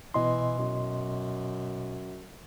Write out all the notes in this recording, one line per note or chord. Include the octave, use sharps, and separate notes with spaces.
B2 E3 D#5 C6
F#2